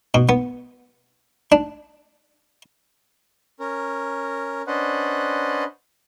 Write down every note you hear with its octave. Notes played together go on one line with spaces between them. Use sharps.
B2
B3
D4
C#4 A#4
C#4 D4 B4 C5 D#5 F#5